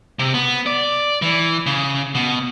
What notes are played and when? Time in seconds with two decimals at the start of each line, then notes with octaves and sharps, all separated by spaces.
0.19 C3
0.34 B3
0.66 D5
1.22 E3
1.66 C#3
2.15 B2